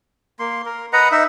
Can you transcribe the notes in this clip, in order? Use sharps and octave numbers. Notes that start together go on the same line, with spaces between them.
A#3 C6
A#4
B4 D#5 F#5 A#5
D#4 E5